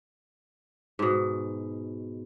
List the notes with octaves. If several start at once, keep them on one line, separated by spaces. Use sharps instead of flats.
G#2 B2